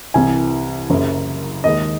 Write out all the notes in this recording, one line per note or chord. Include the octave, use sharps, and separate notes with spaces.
C2 C3 E3 G#5
F#1 F#2 C#3
D#2 D#3 G#3 D#5